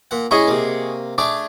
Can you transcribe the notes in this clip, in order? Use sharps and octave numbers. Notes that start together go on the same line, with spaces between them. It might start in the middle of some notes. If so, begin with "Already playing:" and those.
A#2 F#5
G#3 C#4 E4 G#4 D#5 C#6
C3 A#3
A3 D4 G#4 D6